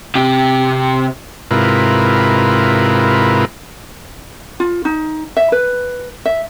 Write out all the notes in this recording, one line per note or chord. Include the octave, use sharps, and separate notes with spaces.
C3 G4
G#2 C3 E4 F4 A#4 B4
F4
D#4
E5
B4
E5